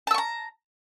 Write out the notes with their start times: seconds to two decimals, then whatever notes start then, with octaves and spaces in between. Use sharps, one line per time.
0.07 A5
0.11 E6
0.14 C#6
0.18 A#5